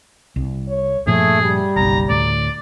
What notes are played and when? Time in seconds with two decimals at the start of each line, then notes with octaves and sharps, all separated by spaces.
0.36 C2
0.68 C#5
1.07 G2 A#2 F3 A3 G#4
1.42 G3
1.76 F#1 B1 A#5
2.09 D2 A2 D5